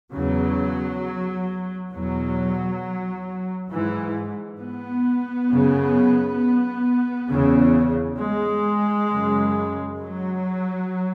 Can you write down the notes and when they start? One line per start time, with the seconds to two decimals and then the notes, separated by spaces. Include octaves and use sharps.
0.13 E2 C#3 F#3
1.93 E2 B2 F#3
3.72 G#2 E3
4.62 B3
5.52 F#2 C#3
7.31 E2 C#3
8.21 G#3
9.10 F#2 C#3
10.00 F#3